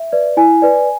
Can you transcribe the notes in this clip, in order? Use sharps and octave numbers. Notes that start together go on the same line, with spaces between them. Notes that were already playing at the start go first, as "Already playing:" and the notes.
Already playing: E5
B4 D5
E4 G#5
B4 D5